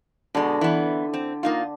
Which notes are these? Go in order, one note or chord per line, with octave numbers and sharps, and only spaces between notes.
B2 D3 G#3
E3 B3
C4
A#3 D#4 F4